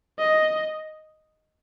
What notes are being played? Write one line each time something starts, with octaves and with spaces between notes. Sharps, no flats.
D#5